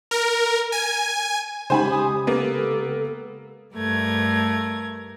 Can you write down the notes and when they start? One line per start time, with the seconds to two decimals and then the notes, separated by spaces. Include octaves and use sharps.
0.11 A#4
0.72 G#5
1.70 C#3 G#3 D#4 G4 C5 G#5 B5
1.90 D#6
2.27 A#3 B3 A4
3.74 G2 A3 A#4 G#6